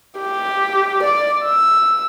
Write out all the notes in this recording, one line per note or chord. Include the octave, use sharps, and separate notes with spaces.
G4
D5
E6